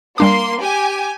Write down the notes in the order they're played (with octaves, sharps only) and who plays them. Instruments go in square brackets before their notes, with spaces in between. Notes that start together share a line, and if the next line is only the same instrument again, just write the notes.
[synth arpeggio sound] G3 D4 D6 [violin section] A#3 C6
[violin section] G4 G#5